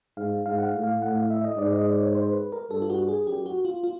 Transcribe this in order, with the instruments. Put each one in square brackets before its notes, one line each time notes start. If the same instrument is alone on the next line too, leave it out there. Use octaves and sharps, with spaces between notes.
[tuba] G#2 [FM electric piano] F5
[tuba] G#2 [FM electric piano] F5
[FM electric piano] F#5
F5
[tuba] A2
[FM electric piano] F5
[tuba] A2 [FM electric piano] F#5
[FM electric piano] F5
E5
D#5
[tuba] G#2 [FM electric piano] D5
[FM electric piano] D#5
D5
C#5
C5
B4
A#4
[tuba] G2 [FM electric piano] A4
[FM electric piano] F4
F#4
G#4
[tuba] F#2 [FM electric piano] G4
[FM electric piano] F#4
F4
F4